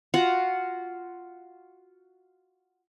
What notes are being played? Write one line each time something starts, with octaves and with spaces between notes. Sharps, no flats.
F4 F#4 F#5